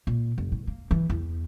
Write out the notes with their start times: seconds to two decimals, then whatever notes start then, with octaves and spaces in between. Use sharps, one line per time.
0.07 A#2
0.38 F#1
0.52 A2
0.67 A#3
0.91 E3
1.10 E2